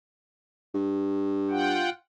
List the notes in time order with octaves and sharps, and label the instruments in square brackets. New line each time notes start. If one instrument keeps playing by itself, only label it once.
[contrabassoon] G2
[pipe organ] F4 F#5 G5